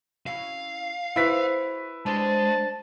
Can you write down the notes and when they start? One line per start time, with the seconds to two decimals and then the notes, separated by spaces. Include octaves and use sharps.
0.26 C#4 E4 F#4 F5
1.16 E4 F#4 G#4 B4 C5 B6
2.06 G#3 D4 G4 C5 A5